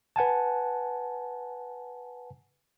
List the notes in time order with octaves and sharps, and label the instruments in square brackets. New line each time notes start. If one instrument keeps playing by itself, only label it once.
[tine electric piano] B4 F#5 G#5 A5